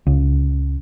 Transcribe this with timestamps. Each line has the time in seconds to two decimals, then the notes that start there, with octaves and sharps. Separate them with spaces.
0.07 C#2